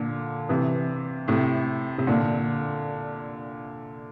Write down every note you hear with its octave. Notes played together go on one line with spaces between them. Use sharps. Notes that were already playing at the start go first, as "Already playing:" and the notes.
Already playing: A#2 D3
C3 E3
A2 C3
C3
A#2 D3